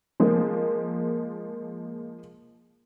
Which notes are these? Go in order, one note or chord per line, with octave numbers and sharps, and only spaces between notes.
F3 G#3 A#3